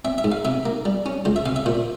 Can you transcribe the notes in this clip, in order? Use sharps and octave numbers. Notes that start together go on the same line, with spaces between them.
C4 E5
E5
G#2
F5
C3 E5
A#3
G3
C#4
C#2 C5
E5
C3 F5
E5
A#2 C5